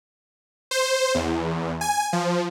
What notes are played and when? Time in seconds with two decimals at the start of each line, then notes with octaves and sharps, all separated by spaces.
0.71 C5
1.15 E2
1.81 G#5
2.13 F3